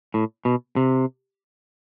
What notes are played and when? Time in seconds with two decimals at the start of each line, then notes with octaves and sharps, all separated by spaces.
0.14 A2
0.45 B2
0.76 C3